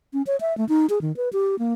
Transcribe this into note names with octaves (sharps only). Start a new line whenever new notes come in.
C#4
C#5
E5
A3
D#4
G#4
D#3
B4
G4
A#3